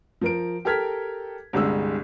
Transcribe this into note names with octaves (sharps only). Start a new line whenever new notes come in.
F3 A#4 D7
G4 A4 A#4 F6 G#6 B6
G1 C2 G3 G#3 D4 E6